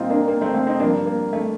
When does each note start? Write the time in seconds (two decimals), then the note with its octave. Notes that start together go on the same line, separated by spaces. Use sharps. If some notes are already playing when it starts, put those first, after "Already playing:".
Already playing: A#2 G3 C4 D#4 F4
0.10 A#3 D4
0.28 A#3
0.41 A3 C4
0.54 A3 C4
0.67 C4 D#4
0.80 G2 F3 A#3 D4
1.06 A#3
1.33 A3